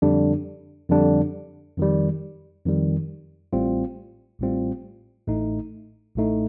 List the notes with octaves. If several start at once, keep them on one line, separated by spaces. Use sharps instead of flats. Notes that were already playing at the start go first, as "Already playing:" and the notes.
F2 D3 G3 D4
F2 D3 G3 D4
F2 D#3 G3
F2 D#3 G3
A1 A2 G3 C4 F4
A1 A2 G3 C4 F4
A1 A2 A3 D#4
A1 A2 A3 D#4